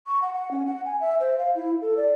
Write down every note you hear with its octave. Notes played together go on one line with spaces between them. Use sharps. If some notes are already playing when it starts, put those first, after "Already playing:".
C#6
F#5
F#5
C#4
F#5
G#5
E5
C5
F5
E4
A4
D5